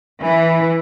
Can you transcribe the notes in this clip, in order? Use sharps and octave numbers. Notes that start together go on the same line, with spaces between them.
E3